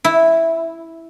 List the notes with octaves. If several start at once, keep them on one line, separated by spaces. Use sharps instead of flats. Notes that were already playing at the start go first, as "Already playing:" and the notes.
E4